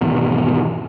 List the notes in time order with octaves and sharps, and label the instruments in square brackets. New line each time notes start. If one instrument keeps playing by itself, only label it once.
[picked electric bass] G#1 E2 B2